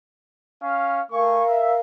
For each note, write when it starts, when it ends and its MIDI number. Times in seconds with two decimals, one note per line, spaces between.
0.61 1.01 61
0.61 1.01 77
1.11 1.42 57
1.11 1.81 70
1.11 1.81 77
1.11 1.42 80
1.11 1.42 85
1.48 1.74 76